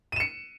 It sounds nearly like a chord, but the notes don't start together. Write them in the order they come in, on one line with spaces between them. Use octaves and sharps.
D#7 E7 C#7